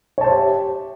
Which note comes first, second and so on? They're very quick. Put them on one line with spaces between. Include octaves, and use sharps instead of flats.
C#5 A5 C5 E5 G4